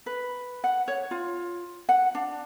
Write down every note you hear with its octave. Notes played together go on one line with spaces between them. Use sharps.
B4
F#5
C#5
F4
F#5
D4